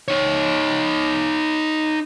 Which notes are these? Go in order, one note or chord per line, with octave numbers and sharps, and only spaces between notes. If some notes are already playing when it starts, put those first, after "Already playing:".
D#4 C#5